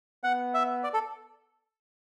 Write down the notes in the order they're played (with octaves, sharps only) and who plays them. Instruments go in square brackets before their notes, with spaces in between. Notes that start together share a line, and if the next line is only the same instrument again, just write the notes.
[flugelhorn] B3 [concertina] F#5
[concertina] E5
D5
A4